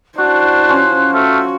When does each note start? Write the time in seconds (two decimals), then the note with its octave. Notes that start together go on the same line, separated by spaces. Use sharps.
0.18 D4 E4 F#4 C5 F#6
0.68 F3 C#4
1.14 A3 F#4 F6